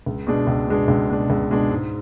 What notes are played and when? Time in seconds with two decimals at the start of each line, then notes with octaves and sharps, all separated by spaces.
0.06 C#2
0.27 B2 G#3 D4
0.47 C#2
0.68 B2 G#3 D4
0.88 C#2
1.09 B2 G#3 D4
1.30 C#2
1.50 B2 G#3 D4
1.70 G#2